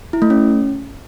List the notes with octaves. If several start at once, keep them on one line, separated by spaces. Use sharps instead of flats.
E4
A3
C#4